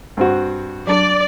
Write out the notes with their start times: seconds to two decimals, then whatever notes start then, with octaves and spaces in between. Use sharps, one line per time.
0.17 G2 C4 F#4
0.87 F#3 D4 D5